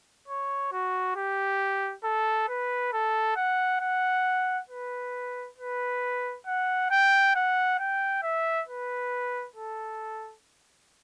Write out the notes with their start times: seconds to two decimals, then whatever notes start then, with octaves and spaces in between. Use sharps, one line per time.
0.28 C#5
0.72 F#4
1.16 G4
2.04 A4
2.49 B4
2.93 A4
3.36 F#5
3.81 F#5
4.70 B4
5.58 B4
6.47 F#5
6.91 G5
7.35 F#5
7.79 G5
8.23 E5
8.68 B4
9.56 A4